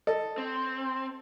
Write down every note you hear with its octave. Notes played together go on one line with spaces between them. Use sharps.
A4 D#5
C4